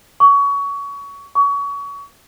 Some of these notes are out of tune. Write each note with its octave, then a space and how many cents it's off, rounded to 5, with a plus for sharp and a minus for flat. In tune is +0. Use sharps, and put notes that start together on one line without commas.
C#6 +25
C#6 +30